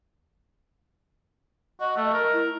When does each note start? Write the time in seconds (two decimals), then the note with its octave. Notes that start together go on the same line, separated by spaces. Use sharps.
1.81 F#4 D#5
1.97 A3
2.13 A#4
2.33 E4